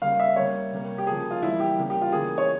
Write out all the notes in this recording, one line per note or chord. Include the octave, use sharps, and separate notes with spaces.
C#3 G3 A#3 F5
E5
C#3 G3 A#3 C#5
C3 G3 A#3
G4
C#3 F3 A#3 G#4
F4
E3 G3 A#3 E4
G4
C#3 G3 A#3
G4
F4
C#3 E3 A#3 G#4
C#5